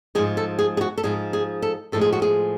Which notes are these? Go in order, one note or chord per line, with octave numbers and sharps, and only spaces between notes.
G#2 F3 G#3 G#4
A4
G#4
G#4
F#4
A4
G#2 F3 G#3 G#4
G#4
A4
A2 F3 G#3 A4
G#4
F#4
G#4